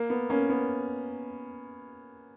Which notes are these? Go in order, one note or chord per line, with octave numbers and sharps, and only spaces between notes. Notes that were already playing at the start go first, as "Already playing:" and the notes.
Already playing: A#3
B3
A#3 C#4
B3